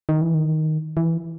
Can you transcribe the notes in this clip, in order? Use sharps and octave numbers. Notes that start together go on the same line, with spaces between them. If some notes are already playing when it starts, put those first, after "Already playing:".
D#3
E3
D#3
E3